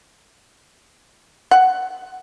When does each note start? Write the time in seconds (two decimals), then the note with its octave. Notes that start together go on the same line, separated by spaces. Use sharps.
1.51 F#5